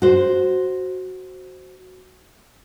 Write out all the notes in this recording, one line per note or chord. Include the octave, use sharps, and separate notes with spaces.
F#4 C5